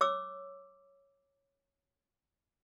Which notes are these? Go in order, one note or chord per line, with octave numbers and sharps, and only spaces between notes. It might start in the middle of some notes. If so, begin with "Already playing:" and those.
C#5 D6 E6